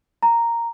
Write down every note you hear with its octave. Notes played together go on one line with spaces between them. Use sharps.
A#5